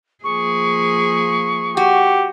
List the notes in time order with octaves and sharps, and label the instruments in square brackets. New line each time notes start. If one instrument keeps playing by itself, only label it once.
[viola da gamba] F3 A#3 G#4 [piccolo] C#6
[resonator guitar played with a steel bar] F#4 [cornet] G4